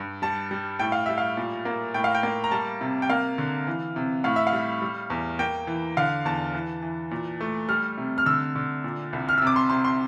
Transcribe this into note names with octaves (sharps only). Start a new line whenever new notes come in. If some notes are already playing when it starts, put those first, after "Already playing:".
Already playing: G2
G3 A5
G3
A2 G5
F5
G3 E5
F5
A#2
A#3
A2 G5
F5
G5
A#3
A#5
G3 A5
C3
G5
A#3 F5
D3
E3
C3
A2 F5
E5
F5
G3
G3
E2
A#3 G5
E3
D3 F5
E2 A5
E3
E3
A#2
A3
G3 F6
C3
F6
D3 E6
D3
A#2
C2
F6
C3 E6
D6
C6
C3 C6
C6